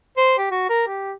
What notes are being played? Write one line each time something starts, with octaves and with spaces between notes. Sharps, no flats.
C5
G4
F#4
A#4
G4